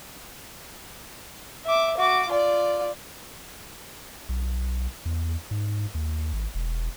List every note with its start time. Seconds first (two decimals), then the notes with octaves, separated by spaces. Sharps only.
1.66 E5 D6
1.98 F#4 D6
2.29 F4 D5
4.29 B1
5.05 E2
5.51 G#2
5.95 D#2
6.33 G#1
6.55 E1